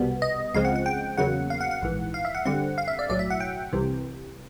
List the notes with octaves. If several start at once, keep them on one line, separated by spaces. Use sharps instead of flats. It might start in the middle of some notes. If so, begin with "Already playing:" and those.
Already playing: C2 B2 G3 B3
D#5
C#2 C#3 F3 G#3 C4 F5
F#5
F#5
G5
E2 C#3 F#3 A#3 F#5
F5
F#5
F#5
A#1 G#2 E3
F5
E5
F#5
G2 D3 G3 C4 F#5
F5
E5
D5
B1 A2 F#3 D5
E5
F#5
G5
C2 C3 E3